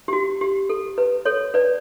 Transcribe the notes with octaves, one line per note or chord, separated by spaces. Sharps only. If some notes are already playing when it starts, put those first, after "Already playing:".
G4
F#4
G4
A4
B4
A4 C#5
B4 D5